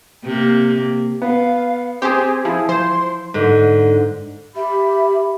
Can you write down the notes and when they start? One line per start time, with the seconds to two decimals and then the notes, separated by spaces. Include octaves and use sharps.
0.24 C3 A#3
1.22 B3 F5
2.02 C4 G4 G#4 C5 D#6
2.45 F3 E4 G#4
2.69 F3 C5 C6
3.34 G#2 D3
4.56 G4 E5 B5